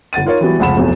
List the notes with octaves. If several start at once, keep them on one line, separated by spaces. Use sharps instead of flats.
G1 F#5 A6 D#7
D#4 F4 A#4 C#5
E3 F#3 G3 B3 F#4
F1 C#2 F3 F#5 B5 E7
F1 B1 E2